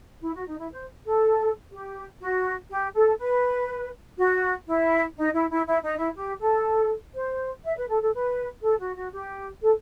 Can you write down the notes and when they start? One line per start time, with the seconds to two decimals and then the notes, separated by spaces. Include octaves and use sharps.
0.22 E4
0.34 F#4
0.47 D#4
0.59 E4
0.72 C5
1.04 A4
1.71 G4
2.20 F#4
2.70 G4
2.95 A4
3.19 B4
4.18 F#4
4.67 E4
5.17 D#4
5.33 E4
5.50 E4
5.66 E4
5.82 D#4
5.98 E4
6.15 G4
6.40 A4
7.14 C5
7.64 E5
7.76 B4
7.89 A4
8.01 A4
8.13 B4
8.62 A4
8.79 F#4
8.95 F#4
9.12 G4
9.61 A4